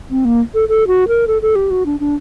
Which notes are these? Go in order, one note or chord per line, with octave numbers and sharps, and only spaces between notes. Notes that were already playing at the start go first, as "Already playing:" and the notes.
C4
A#3
A4
A4
F#4
A#4
A4
A4
G4
F#4
D4
D4